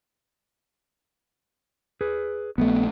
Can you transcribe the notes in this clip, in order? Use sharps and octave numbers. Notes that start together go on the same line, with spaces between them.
G#4 B4
A#1 A3 B3